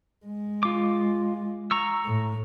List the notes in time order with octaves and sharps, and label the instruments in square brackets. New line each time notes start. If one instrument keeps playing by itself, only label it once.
[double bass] G#3
[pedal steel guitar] F4 D6
A#5 C#6 E6
[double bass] A2